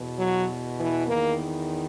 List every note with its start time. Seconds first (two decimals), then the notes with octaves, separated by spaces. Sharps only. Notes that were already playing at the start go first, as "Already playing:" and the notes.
Already playing: E2 B2
0.17 F#3
0.78 E3
1.07 E2 D#3 A#3